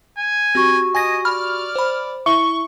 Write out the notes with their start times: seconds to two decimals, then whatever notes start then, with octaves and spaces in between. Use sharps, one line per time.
0.18 G#5
0.55 C4 F#4 G4 C#6
0.95 D#5 G#5 G#6 A#6
1.25 D5 B5 F6
1.76 C5 B5
2.26 E4 E5 C#6 G7